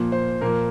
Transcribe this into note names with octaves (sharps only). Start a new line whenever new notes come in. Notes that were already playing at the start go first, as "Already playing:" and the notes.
Already playing: A#2 F3 A#3
C5
A#2 F3 A#3 A#4